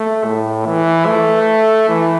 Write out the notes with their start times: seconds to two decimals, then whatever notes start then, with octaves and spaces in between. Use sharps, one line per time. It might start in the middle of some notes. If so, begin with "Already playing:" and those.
Already playing: A3
0.25 A2
0.66 E3
1.06 A3
1.89 E3